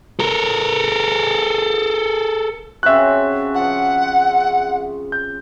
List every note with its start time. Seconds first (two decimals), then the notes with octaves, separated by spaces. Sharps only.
0.20 A4 A#4
2.83 C#3 C4 F#4 E5 F#6
3.54 F3 F#5
5.12 G6